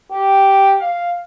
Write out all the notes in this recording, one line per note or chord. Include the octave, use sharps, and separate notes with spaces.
G4
F5